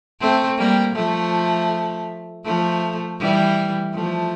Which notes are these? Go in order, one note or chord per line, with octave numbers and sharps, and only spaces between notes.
A3 C4
G3 A#3
F3 A3
F3 A3
E3 G3
F3 A3